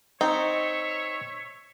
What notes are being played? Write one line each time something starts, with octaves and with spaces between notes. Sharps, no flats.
C4 D#4 C#5 E5 C#6